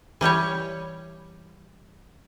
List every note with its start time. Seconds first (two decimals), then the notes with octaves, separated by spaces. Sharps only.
0.21 E3 G3 G4 C#5